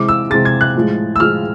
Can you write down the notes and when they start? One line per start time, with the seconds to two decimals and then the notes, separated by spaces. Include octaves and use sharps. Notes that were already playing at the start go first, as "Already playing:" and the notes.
Already playing: C3 E3 G#3 D6
0.08 E6
0.30 C3 E3 G#3 A6
0.45 G#6
0.61 F#6
0.75 A2 F3 G#3
1.16 E6
1.20 A2 F3 G#3 F6